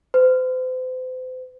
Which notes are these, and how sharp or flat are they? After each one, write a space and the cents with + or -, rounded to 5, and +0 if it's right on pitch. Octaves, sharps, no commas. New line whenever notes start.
C5 -40